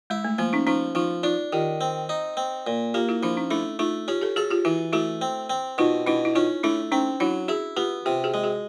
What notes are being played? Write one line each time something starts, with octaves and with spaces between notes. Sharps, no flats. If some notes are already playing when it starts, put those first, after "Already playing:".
G#3 E4
A3
F3 A#3
C#4 D#4
F3 C#4 D#4
F3 D#4 F4
D4 D#4 F4
D#3 F4 G4
C4
D#4
C4
A#2
A#3 F4 G4
E4 F#4
F3 D4 E4
C#4 D#4
A3 D4 E4
A3 D#4 F4
C#4 F4 G4
G4 A4
F#4 G#4 A4
F4 G4
E3 E4 F#4
A3 E4 F#4
C4
C4
B2 D#4 F4
B2 D4 E4
E4
C#4 D#4 F4
A3 D4 E4
C4 C#4 D#4
F#3 D4 E4
E4 F#4 G#4
B3 F4 G4
C3 F4 G4
F#4 G#4
G#3
F#4 G#4